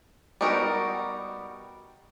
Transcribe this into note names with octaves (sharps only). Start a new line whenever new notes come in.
G3 B3 D#4 F#4 A#4